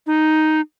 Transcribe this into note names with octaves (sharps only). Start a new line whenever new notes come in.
D#4